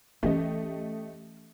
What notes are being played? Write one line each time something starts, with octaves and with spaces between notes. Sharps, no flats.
E3 A3 C#4 G4 D#5